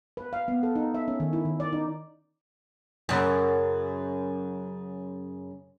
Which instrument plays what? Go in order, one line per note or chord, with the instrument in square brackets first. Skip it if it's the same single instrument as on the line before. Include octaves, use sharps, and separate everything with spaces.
[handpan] B4
F5
B3
A4
D#4
E5
C#4
D#3
E4
D#3
D5
D#4
[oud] F#2 C#3